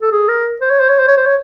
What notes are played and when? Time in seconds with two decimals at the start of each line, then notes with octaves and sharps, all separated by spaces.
0.02 A4
0.12 G#4
0.28 A#4
0.61 C5
0.70 C#5
0.80 C5
0.89 C#5
0.99 C5
1.08 C#5
1.17 C5
1.26 C#5